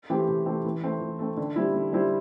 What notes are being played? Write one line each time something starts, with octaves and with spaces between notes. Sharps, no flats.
E3 A3 C4 G4
C3
E3 A3 C4 G4
E3
A3 C4
E3
A3 C4
D3
G3 C4 E4
D3
G3 C4 E4